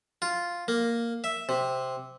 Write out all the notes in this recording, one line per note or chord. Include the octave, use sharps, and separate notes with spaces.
F4
A#3
E5
C3